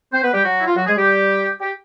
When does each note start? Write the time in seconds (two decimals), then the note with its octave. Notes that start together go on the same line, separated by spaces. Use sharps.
0.13 C4 C5
0.23 B3 B4
0.34 G3 G4
0.45 F#3 F#4
0.59 E4
0.67 F4
0.76 F#3 F#4
0.87 G#3 G#4
0.98 G3 G4
1.61 G4